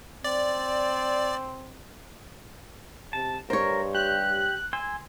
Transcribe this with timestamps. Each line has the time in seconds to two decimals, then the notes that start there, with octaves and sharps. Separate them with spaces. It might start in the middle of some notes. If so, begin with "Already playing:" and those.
0.24 C4 D5
3.13 C3 A5
3.50 G2 A#4 C5 C#5
3.95 G4 F#6
4.73 G#5 C6 E6